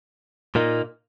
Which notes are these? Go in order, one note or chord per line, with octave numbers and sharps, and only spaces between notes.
A#2 A#3 D#4